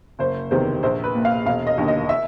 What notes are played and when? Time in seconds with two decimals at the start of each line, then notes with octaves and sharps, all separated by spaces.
0.19 F#1 C5
0.51 E2 C3 D#3 C5
0.83 A#1 C5
1.04 B4
1.15 A#2
1.25 F5
1.45 E1 F5
1.67 D#5
1.78 D#2 D3
1.88 D#5
2.09 E5